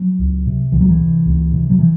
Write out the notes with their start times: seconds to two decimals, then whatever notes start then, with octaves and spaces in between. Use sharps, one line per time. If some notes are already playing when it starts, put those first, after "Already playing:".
Already playing: F#3
0.19 C#2
0.46 C3
0.72 C#2 E3
0.81 F#3
0.89 E3
1.00 C3
1.25 C#2
1.53 C3
1.70 F#3
1.79 E3